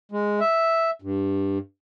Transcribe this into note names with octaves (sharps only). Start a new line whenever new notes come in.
G#3
E5
G2